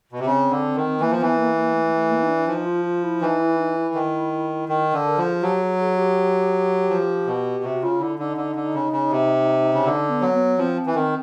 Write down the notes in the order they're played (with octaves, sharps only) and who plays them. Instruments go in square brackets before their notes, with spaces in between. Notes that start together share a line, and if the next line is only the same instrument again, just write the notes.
[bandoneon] B2
C3
[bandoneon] C#3 [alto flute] C4
[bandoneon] D3
D#3
[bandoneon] E3 [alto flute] A#3
[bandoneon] F3
[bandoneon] E3 [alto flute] B3
[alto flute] A#3
A#3
A3
A3
A#3
D#4
D4
[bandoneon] F3 [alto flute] D#4
[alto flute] F4
F4
E4
[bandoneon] E3 [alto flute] D#4
[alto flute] E4
D#4
E4
[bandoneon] D#3
D#3
D3
[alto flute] A#4
[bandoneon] F3 [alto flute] A4
[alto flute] G#4
[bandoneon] F#3 [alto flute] G4
[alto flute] G#4
G#4
G4
[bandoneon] F3
B2
[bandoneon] C3 [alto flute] F#4
[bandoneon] C#3 [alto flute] F4
[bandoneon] D3 [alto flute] E4
[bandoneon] D3 [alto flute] D#4
[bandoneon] D3
D3
C#3
C#3
C3
C#3
[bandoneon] D3 [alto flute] D#4
[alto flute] B3
[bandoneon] F#3
[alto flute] B3
[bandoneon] F3 [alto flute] C4
[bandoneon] E3
[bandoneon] D#3 [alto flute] C4